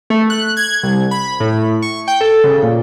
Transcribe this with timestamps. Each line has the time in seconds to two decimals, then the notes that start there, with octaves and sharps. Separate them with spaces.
0.10 A3
0.30 F#6
0.57 G#6
0.83 C2
1.11 B5
1.40 A2
1.82 C#6
2.08 G5
2.21 A4
2.44 C#3
2.63 A#2